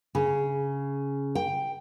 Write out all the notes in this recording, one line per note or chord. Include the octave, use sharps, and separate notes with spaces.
C#3
G5